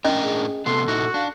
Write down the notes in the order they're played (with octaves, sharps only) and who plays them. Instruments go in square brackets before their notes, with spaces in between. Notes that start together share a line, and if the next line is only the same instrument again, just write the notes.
[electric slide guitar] A2 D4 A#4 [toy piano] C#4 D#5
[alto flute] G#4
[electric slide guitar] C3 A3 B3 [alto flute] A4 [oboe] C6
[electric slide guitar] A#2 D#4 E4 [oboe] F#4
[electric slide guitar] D4 [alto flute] F5